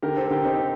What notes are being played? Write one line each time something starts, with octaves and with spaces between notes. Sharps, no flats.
D3 G4 A#4
A4 C5
D3 G4 A#4
C4 D#4